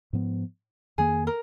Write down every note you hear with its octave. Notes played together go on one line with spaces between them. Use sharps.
G#2 F3 B3
F2 D#3 A#3 G#4
A#4